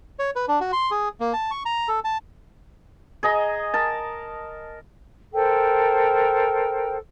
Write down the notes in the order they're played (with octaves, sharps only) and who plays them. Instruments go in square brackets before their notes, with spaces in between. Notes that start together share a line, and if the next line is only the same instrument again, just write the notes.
[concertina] C#5
B4
D4
F#4
C6
G#4
A#3
A5
C#6
A#5
A4
A5
[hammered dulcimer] G#4 D#5 A#5
A#4 A5
[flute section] A4 A#4 C5 G5